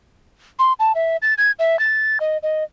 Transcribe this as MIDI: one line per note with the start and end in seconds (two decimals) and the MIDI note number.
0.59 0.73 84
0.79 0.92 81
0.95 1.17 76
1.22 1.34 93
1.38 1.51 92
1.59 1.79 76
1.79 2.18 93
2.20 2.37 75
2.43 2.64 75